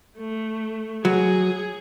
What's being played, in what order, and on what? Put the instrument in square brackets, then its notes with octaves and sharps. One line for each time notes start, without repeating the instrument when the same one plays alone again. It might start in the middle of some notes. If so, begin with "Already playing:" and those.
[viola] A3
[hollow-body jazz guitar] F#3 [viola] G#4